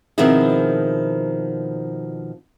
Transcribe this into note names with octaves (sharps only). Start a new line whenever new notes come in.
B2 D#3 F3 C4 E4 G#4